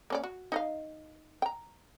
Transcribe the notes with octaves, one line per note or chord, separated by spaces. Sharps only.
A#3 C#4 D5
F#4
D#4 D#5 F5
G5 A#5